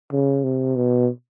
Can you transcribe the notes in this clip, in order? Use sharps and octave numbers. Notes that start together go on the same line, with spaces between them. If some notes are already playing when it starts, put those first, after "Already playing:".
C#3
C3
B2